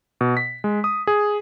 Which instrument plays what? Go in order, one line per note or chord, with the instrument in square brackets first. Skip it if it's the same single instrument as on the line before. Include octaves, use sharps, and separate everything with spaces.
[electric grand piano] B2
B6
G#3
D#6
G#4